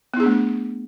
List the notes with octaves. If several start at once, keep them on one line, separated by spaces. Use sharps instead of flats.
A3 B3 D4 E4 G#4